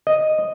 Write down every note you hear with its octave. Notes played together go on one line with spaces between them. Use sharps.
D#5